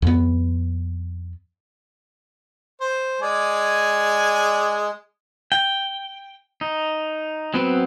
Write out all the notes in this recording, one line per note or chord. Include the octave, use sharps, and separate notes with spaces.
F2 B3
C5
G#3 D5 G#5
G5
D#4
F#3 B3 C4 B4